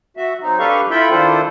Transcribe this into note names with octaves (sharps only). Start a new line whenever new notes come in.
F#4 E5
F#3 C4 D#4
D4 G4 A4 B4 F5 C#6
E4 F4 A4 E5 G5 B5
D#3 D4 E4 F4 A4 C5